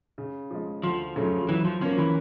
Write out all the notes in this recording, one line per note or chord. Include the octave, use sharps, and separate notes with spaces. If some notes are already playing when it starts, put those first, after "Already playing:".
C#3
F3 G#3
D2 F3
C#3 F#3 A3 C#4
E3 F#3
F3
F3 A#3 C#4
E3